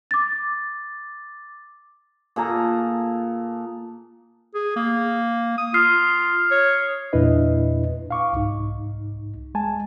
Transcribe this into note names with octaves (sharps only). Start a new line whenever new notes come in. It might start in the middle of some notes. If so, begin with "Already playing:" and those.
D6 A6
A#2 G#4 A4 A#5
G#4
A#3
D#6
F4 D#6 F6 C7
C#5
E2 A#2 D4 E4 B4 D#5
F5 C#6 D6
C2 G#2 D#4
G#3 G#5 A5